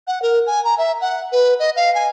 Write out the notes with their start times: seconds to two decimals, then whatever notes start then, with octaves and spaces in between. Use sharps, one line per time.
0.07 F#5
0.22 A#4
0.47 G#5
0.65 A#5
0.78 E5
1.01 F#5
1.32 B4
1.59 D#5
1.76 F5
1.95 G#5